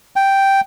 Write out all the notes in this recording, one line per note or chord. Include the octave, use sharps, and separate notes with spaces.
G5